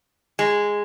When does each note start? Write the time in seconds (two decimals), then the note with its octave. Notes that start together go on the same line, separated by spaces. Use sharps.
0.39 G#3